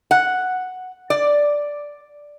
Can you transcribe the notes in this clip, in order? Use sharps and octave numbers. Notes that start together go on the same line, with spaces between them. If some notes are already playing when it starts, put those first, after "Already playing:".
F#5
D5